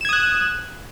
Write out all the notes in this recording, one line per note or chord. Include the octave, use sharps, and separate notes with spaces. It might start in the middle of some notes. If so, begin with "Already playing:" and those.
D#6 F#6 G#6 E7